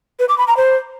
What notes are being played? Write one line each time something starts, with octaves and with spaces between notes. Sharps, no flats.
B4
D6
B5
A#5
C5